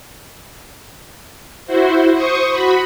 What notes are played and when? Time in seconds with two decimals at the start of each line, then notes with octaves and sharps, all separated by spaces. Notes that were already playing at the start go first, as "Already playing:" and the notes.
1.66 E4 F#4 C5
2.15 C5 C#6 D#6
2.51 F#4 B5